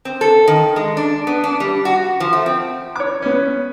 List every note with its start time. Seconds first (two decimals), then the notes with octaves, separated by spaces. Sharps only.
0.05 C4
0.21 A4
0.48 D#3
0.76 G#3
0.97 D4
1.27 B3
1.44 D4
1.60 G3
1.85 F#4
2.20 F3
2.33 A3
2.46 C4
2.96 C#5 D6
3.22 B3 C#4